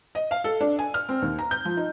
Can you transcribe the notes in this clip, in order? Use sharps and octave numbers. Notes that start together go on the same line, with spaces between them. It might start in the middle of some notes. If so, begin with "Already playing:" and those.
D#5
F5
A4
D4
G#5
F6
C4
D#2
A#5
G6
F3
D#4